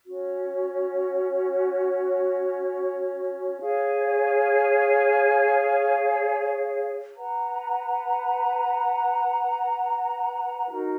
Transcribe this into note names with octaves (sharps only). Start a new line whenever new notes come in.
C#4 F#4 C#5
G#4 C#5 F5
B4 F#5 A#5
D#4 F#4 A#4